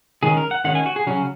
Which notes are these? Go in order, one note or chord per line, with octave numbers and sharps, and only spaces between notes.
D#3 G#3 C#4 G#4
A#4
F#5
D#3 G#3 C#4 F#5
G#5
F#4
G#4
C#3 F#3 C#4